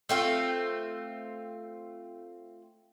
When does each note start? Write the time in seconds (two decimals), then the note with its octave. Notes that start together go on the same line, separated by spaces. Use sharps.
0.09 A3 C4 F4